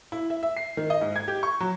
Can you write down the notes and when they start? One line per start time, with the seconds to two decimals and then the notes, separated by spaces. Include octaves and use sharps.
0.12 E4
0.30 E5
0.43 E5
0.57 C7
0.77 D#3
0.90 D#5
1.01 G#2
1.16 G#6
1.28 G4
1.43 C#6
1.60 F#3